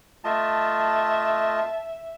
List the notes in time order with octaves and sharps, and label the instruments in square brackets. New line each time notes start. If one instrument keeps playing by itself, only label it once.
[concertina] A3 F4 D#5 [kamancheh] E5 [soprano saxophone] A5